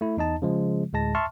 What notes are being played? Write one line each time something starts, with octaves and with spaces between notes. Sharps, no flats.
A3 E4
E2 D#4 D#5 A5
C#3 F3 G#3
D2 A2 G#3 A5 A#6
E5 A5 C6 C#6 F6